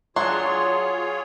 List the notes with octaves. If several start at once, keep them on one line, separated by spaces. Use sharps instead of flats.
F#3 D4 F4 G#4 C#5 C6